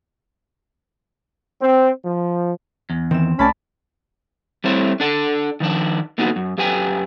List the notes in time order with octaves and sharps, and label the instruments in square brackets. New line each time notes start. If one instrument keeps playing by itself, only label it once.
[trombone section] C4
F3
[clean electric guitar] E2
[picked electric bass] D#3 E3 [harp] C4 E7
[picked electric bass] C2 A3 [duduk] C#4 [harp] D5 A5 B5
[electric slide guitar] G3 A3 C4 E4 C5 C#5
D4 A4 D5
D#3 F3 D4
D3 A#3 B3 D#4 F#4 B4
F#2
F#2 G4 B4 G5 G#5